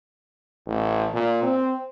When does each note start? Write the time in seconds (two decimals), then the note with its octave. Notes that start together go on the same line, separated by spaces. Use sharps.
0.67 A1
1.14 A#2
1.43 C4